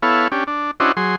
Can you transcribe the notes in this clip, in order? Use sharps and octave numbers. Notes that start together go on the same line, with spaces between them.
B3 E4 A4 C#5 F5
C#4 D4 G4
D4
C#4 D4 E4 F#4 C5 D#5
F#3 G#4 C6